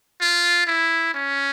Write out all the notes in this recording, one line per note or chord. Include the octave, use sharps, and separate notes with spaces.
F4
E4
C#4